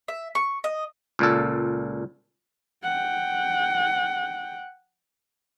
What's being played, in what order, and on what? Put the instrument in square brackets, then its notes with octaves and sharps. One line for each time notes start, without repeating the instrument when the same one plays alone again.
[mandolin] E5
C#6
D#5
[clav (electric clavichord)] C#2 A#2 A4
[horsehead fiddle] F#5 G5